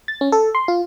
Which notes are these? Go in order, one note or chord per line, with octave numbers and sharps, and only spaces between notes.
A6
C#4
A4
C6
F4